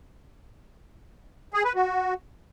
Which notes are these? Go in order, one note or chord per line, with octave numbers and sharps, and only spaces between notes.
G#4
B4
F#4